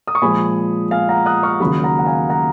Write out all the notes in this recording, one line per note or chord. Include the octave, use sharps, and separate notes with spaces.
D#6
C#6
A#2 F3 G#3 G#5 B5
F5 G#5
F#5 A#5
D#6 F#6
C#6 F6
D#2 C#3 F#3 B5 D#6
F#5 A#5
F#5
F5 G#5
F#5 A#5